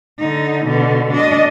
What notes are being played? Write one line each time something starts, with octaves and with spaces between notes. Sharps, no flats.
D3 D#4
B2 D3
D4 D#5